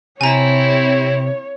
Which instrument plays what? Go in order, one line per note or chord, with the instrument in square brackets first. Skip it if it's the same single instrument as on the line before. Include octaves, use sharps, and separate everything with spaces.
[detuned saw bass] C3 [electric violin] C4 E4 [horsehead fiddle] C#5 [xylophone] G#5 A#5